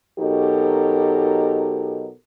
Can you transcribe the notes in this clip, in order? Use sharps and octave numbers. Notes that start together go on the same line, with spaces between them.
B2 F#3 D#4 G4 A4 A#4